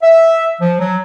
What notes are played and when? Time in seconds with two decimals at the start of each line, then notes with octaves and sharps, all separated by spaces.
0.03 E5
0.61 F3
0.80 F#3